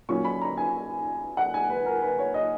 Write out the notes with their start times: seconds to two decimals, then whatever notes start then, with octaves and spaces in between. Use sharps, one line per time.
0.09 A#2 F#3 C#4 C#6
0.24 B5
0.41 A#5
0.58 G#5
1.37 F#5
1.54 G#5
1.70 B4
1.86 A#4
2.02 B4
2.19 C#5
2.34 D#5